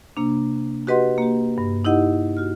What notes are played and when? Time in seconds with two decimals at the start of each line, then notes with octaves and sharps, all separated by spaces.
0.17 C3 A#3 D4
0.87 F#4 G4 B4 D#5 F#5 C6
1.18 A#3 G4
1.58 G2
1.85 D#4 E4 G4 D#5 F#5
2.37 F#4 F6